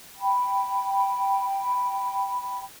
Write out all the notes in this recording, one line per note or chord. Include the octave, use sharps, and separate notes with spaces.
G5 B5